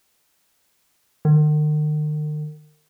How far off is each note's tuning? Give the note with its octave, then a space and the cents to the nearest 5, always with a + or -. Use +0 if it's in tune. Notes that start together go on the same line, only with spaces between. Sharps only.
D#3 -45